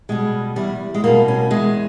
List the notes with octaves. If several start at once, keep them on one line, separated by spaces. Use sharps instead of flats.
B2 G3 G#3
E2 G3
G#3
B2 G3 A#3
C#4
E2 G#3